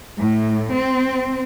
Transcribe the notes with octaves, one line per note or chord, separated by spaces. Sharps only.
A2
C4